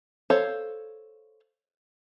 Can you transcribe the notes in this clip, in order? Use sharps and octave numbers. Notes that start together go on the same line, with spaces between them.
A4 C5 C#5 F5